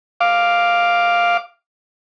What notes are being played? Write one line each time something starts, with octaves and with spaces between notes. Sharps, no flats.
F5 D6